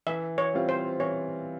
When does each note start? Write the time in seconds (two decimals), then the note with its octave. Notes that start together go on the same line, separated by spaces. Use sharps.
0.07 E3 E5
0.38 C#5
0.53 G3 C4 F4
0.69 C5
1.00 E3 C#5